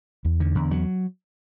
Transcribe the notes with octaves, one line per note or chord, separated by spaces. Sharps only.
E2
D3
E2
F#3